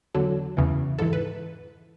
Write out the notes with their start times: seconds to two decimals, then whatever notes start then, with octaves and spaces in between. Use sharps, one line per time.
0.14 E2 D3 F#3 A4
0.57 E2 C#3 E3
0.98 G#2 E3 A4
1.13 B4